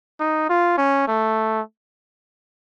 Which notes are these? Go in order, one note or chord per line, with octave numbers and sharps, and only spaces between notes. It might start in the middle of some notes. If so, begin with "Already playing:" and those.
D#4
F4
C#4
A3